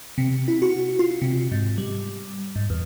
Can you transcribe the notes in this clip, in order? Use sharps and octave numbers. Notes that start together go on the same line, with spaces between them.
C3
E4
F#4
F4
C3
G#2
G3
G#2
E2